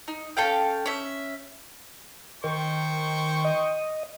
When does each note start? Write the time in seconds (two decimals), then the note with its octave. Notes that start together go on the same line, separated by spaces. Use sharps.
0.08 D#4
0.37 C#4 A4 F5 G5
0.86 C#4 E5
2.44 D#3 C5 G5 C#6
3.45 D#5